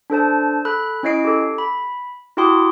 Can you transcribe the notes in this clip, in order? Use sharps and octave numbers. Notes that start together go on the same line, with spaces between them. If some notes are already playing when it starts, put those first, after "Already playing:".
D4 A4 C5 A5
A4 B5 F#6
C#4 E4 C#5 D#5 C7 D7
G4 A4
B5
E4 F#4 G4 G5 C6 D#6